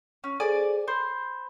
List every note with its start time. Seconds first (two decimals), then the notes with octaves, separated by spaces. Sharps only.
0.24 C#4
0.40 G#4 A4 C5 D5 G#5 D6
0.88 C5 B5